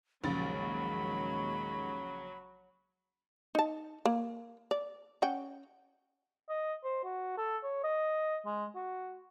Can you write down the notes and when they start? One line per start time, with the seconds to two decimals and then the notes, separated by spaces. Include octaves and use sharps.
0.24 A#1 D#2 C#3 F#3 G#3 B5 A6
3.55 D#4 A5
4.05 A#3
4.71 D5
5.22 C#4 F#5 G5
6.49 D#5
6.84 C5
7.04 F#4
7.38 A4
7.63 C#5
7.84 D#5
8.46 G#3
8.75 F#4